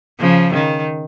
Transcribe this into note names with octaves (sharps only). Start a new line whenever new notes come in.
C#3 F3
D#3